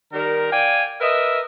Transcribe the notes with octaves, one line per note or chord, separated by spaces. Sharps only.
D#3 G3 A#4
D5 F5 G5 G#5
A#4 B4 D#5 E5